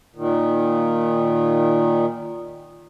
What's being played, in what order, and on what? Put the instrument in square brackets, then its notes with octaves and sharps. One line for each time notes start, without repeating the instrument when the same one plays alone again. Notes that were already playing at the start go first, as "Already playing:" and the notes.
[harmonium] A#2 D#3